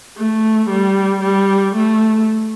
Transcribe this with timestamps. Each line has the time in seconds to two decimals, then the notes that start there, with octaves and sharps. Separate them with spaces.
0.17 A3
0.69 G3
1.22 G3
1.75 A3